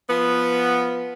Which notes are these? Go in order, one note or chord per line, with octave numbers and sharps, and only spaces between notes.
F3 B3